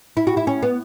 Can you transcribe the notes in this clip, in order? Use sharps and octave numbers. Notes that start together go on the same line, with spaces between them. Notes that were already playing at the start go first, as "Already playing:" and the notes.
E4
F#4
E4
C#4
B3